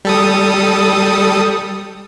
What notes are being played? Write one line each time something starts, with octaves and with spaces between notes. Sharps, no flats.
G3 A4 D#6